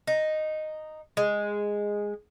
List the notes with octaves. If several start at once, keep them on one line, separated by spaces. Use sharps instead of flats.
D#4
G#3